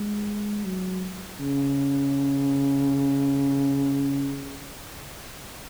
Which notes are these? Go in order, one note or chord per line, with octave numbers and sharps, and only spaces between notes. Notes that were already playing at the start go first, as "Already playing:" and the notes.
Already playing: G#3
F#3
C#3